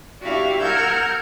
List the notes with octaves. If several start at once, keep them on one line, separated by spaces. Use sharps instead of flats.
D4 E4 F#4 G4 F5
A#4 F#5 E6 F6 G6 G#6